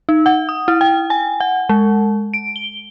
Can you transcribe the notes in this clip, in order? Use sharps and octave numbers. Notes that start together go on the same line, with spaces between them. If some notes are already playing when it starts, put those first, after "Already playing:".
D#4
F#5
D#6
E4
G5
G#5
F#5
G#3
D7
G7